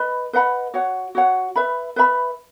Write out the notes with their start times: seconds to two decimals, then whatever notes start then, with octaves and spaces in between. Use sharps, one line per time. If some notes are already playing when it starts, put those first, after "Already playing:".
Already playing: B4 D#5 B5
0.33 B4 D#5 F#5 B5
0.74 F#4 C#5 F#5
1.15 F#4 C#5 F#5
1.56 B4 E5 B5
1.96 B4 E5 B5